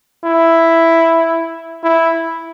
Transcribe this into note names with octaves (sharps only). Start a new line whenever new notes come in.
E4
E4